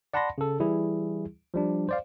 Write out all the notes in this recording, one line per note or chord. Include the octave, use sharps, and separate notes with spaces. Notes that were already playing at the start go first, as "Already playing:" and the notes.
D5 F#5 A5 B5 C6 A#6
C#3 A4
E3 G3 E4 G#4
F3 G3 D4
C5 D5 F5